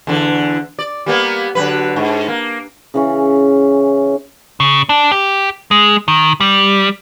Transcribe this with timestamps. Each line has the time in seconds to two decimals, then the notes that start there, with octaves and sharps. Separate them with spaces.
0.07 E2 D3
0.79 D5
1.06 G3 A#3 B3
1.55 D3 F#3 B4
1.96 G#2
2.28 A#3
2.94 C#3 E3 C#4
4.60 C#3
4.89 D4
5.12 G4
5.71 G#3
6.08 D#3
6.40 G3